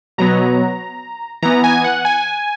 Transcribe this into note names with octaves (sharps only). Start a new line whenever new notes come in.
B2 F#3 B3 A#5
E3 B3 A#5
G#5
F#5
G#5